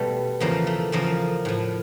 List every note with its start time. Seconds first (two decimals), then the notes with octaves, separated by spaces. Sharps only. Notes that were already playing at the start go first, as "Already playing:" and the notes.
Already playing: B2 G3 A3
0.40 E2 C#3 F3 A#3
0.67 A3
0.92 E2 C#3 F3 A#3
1.45 A2 F3